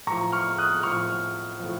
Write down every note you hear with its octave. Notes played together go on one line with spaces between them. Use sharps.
A2 F3 A#5 C#6
C#6 F6
D#6 F#6
A2 F3 C#6 F6
A2 F3